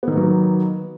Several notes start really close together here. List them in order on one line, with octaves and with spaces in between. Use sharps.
B3 D#3 A#3 F#3